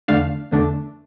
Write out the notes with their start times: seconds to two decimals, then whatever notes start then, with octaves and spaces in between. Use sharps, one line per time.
0.08 E2 D3 A3 D4 F5
0.51 E2 D3 A3 D4